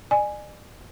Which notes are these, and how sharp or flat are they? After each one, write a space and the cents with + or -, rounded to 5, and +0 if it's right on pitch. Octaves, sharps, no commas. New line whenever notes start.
D5 +45 G#5 +0